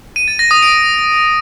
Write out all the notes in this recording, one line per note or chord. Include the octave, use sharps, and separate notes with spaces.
D#7
A6
A#6
D#6
D7